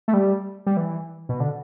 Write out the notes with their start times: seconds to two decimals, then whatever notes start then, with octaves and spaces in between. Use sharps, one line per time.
0.08 A3
0.14 G3
0.67 G3
0.77 E3
1.29 B2
1.40 D3